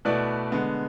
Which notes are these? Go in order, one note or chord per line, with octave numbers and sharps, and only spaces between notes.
B2 A3 E4 B4 D5
D3 G#3 B3